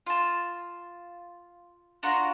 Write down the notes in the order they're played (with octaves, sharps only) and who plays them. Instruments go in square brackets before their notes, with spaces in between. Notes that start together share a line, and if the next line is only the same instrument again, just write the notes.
[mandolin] F4 A5
D4 F4 F#4 A#5